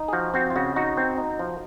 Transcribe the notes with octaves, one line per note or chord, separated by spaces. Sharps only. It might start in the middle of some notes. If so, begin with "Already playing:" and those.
Already playing: D#4
G#4
F3 F#4
C4 F#4
F4
C#3 F#4
D#4 F#4
C4
D#4
F3